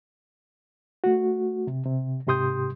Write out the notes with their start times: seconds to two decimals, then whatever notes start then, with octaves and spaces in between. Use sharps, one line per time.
1.04 A3 F#4
1.67 C3
1.85 C3
2.27 G#2 C3 G4 C6 D#6 G6